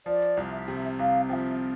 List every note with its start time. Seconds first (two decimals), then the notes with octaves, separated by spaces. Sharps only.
0.06 F3 D5
0.37 C2
0.52 E5
0.68 C3
0.99 C2 F5
1.29 F3 E5 G5